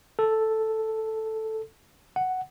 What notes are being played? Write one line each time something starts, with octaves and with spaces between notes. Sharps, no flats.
A4
F#5